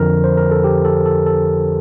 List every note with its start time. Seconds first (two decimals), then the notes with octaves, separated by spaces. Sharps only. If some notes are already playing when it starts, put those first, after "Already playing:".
Already playing: F2 D3 F3 A#4
0.24 C5
0.37 A#4
0.51 A4
0.64 G4
0.85 A4
1.06 A4
1.26 A4